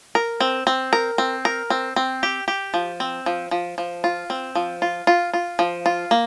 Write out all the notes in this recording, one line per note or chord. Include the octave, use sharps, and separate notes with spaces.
A#4
C4
C4
A#4
C4
A#4
C4
C4
G4
G4
F3
C4
F3
F3
F3
F4
C4
F3
F4
F4
F4
F3
F4
A#3